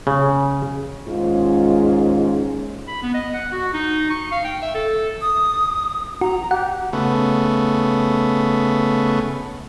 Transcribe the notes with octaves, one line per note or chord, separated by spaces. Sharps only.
C#3
D#2 G#2 G#3 C#4 F4
B5
B3
D#5
F#5
F#4
D#4
C#6
F5
G5
E5
A4
D#6
F#4 A#5
G4 F#5
C#3 A3 B3